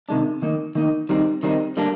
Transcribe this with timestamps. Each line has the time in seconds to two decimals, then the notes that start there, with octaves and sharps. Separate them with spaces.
0.09 C3 D#3 G#3 D4
0.42 D#3 A#3 D#4
0.75 D#3 A#3 D#4
1.09 D#3 G3 C4 D#4
1.43 D#3 G3 C4 D#4
1.77 D3 G3 A#3 D4